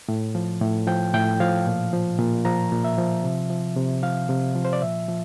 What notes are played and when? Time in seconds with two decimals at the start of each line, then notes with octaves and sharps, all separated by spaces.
0.08 A2
0.35 F3
0.61 A2
0.87 F3 G5
1.14 A2 G5
1.40 F3 F5
1.66 A#2
1.93 F3
2.19 A#2
2.45 F3 A#5
2.71 A#2
2.84 E5
2.98 F3
3.24 C3
3.50 F3
3.77 C3
4.03 F3 F5
4.29 C3
4.55 F3
4.65 C5
4.73 D5
4.82 A#2 E5
5.08 F3